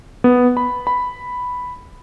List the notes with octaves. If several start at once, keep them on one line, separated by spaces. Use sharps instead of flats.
B3
B5
B5